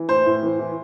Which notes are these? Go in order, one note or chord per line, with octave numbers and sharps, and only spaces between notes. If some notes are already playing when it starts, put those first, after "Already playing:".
Already playing: E3
A2 C5
A2
E3
E3